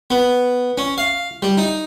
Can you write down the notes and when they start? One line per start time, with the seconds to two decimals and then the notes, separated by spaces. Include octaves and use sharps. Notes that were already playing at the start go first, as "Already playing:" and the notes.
0.10 B3
0.78 C#4
0.98 F5
1.42 G3
1.58 D#4